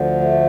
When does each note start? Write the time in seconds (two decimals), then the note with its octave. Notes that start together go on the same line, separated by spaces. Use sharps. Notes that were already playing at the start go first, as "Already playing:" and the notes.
Already playing: D2 D3 F3
0.20 A3